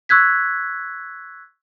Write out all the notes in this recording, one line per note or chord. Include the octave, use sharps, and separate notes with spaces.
C#6 E6 F#6 G#6 B6